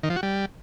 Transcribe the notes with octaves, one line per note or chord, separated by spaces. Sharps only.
D#3
F3
F#4
G3